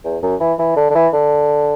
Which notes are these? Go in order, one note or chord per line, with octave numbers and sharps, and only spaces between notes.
E2
F#2
E3
E3
D3
D3
E3
D3